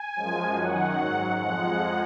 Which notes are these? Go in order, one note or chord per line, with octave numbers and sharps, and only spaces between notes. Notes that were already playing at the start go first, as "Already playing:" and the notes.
Already playing: G#5
F#2 F3 G#3
F#2 D#3 F#3 F#5
G#2 F#3
F2 F3 G#3 F#5